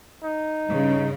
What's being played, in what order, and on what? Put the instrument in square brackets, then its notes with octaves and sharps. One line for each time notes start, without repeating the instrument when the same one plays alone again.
[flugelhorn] D#4
[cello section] G2 C#3